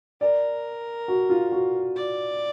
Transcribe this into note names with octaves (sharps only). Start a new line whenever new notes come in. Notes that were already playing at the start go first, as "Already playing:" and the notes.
A#4 D5
F#4
F4
F#4
D5